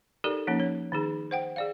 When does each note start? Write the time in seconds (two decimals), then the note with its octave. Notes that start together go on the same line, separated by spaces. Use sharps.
0.24 D#4 G4 A4 A#4 D5
0.47 F3 A#3 C#4 D#4
0.60 C#5
0.92 D#3 D#4 G#4
1.31 C5 F#5 G5
1.56 G#4 D5 F5